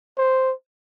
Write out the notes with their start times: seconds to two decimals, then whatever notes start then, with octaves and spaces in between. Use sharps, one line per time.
0.18 C5